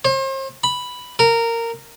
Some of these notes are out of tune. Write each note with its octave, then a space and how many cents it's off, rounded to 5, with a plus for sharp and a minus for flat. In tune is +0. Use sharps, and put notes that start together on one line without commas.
C5 +40
B5 +0
A#4 -15